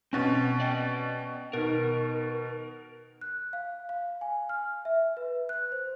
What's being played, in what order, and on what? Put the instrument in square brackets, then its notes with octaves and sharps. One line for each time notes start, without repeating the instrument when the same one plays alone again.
[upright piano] B2 C#4 [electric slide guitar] C4 D#5
[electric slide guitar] D5 D#5 G5
[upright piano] B2 D#3 [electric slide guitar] A#4
[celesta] F#6
F5
F5
G#5
F6
E5
B4
F#6
C5